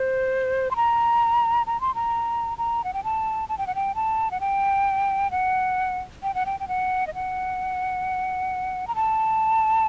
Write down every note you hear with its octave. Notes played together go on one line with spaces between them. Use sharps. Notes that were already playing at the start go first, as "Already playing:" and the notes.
Already playing: C5
C6
A#5
A#5
C6
A#5
A#5
F#5
G5
A5
A5
G5
F#5
G5
A5
F#5
G5
F#5
G5
F#5
G5
G5
F#5
D#5
F#5
A#5
A5